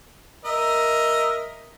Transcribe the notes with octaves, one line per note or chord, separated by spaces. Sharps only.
A#4 D#5 E5